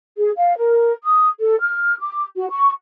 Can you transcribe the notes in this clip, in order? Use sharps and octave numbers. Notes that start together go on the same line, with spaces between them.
G#4
F5
A#4
D#6
A4
F6
D6
F#4
C#6